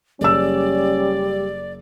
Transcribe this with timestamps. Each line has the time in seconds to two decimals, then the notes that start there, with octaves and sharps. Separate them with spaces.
0.21 F#1 G3 C#4 D5 E6